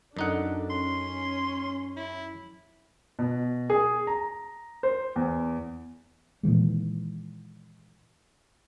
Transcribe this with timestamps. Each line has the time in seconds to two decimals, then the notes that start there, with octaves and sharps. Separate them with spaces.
0.17 F#2 D4 D#4 A4 F#5
0.70 C#4 C6
1.97 E4
3.19 B2
3.70 G#4
4.07 A#5
4.83 C5
5.16 E2
6.43 A#2 D#3 E3 G#3